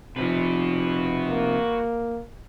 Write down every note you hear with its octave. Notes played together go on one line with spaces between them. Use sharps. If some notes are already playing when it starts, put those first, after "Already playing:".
C3 F3 F#4 B4
A#3